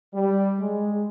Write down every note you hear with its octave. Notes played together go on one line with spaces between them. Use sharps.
G3
G#3